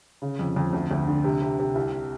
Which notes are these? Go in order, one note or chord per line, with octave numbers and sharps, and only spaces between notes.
C#3
F2
F2
D2
D2
D3
C3
C3
C3
C2